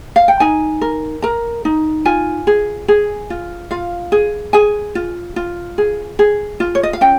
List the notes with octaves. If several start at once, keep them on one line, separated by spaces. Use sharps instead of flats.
F5
G5
D#4 G#5
A#4
A#4 A#5
D#4
F4 G#5
G#4
G#4
F4
F4 F5
G#4
G#4 G#5
F4
F4
G#4
G#4
F4
C#5
D#5
F5
C#4 G5